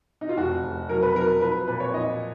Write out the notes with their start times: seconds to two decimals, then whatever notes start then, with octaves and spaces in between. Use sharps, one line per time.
0.21 D#4
0.29 F4
0.38 F1 F#4
0.64 F1
0.89 F#3 A#4
1.03 B4
1.16 F#3 A#4
1.41 F3 B4
1.68 A#2 B4
1.80 C#5
1.94 F3 D#5